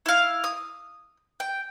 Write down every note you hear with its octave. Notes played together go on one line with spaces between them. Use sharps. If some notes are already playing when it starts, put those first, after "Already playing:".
E4 F5
D#6
G5